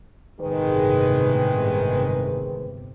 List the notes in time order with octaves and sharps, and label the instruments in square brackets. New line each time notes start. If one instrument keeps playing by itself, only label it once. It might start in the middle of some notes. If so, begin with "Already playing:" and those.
[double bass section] G1 A2 C3 [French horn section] D#3 G#3 B4